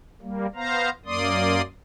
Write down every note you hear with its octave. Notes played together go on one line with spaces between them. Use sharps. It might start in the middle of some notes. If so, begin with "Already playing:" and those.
G3 A#3
B3 C5 F5 A#5
F#2 A#3 D5 C6 D#6